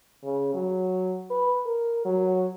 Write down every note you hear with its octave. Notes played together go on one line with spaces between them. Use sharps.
C#3
F#3
B4
A#4
F#3